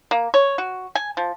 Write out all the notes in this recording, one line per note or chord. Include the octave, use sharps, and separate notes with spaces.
A#3
C#5
F#4
G#5
F3